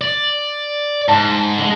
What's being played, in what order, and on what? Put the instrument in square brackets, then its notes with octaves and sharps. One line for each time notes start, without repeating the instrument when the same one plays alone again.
[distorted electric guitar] D5
[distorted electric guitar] G#2 [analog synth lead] A5
[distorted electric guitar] D3 G#3